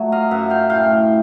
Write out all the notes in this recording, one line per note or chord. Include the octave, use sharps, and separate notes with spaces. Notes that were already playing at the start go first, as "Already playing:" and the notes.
Already playing: F#3 A3
D#5 F5
F#2 E5 F#5
F5 G5
A2 F5 G5